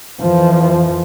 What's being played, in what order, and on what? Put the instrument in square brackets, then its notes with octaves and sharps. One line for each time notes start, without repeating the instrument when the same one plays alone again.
[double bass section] F2 E3 F3